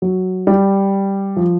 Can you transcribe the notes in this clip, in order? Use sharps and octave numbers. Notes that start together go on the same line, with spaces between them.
F#3
G3
F3